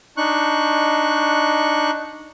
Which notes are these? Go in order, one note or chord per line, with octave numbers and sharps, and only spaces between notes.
D4 D#4 C#6 F#6